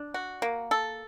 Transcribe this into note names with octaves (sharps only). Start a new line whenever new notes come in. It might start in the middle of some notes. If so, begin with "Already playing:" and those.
Already playing: D4
F#4
A#3
A4